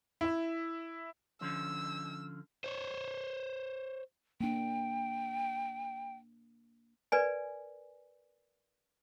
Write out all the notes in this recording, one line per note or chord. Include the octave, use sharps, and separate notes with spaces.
E4 E5
D3 F3 C#4 E6
C5 C#5
A#3 D4 G5
A#4 B4 D5 G#5